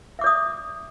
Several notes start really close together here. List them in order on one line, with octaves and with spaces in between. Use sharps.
E5 D6 D5 D#6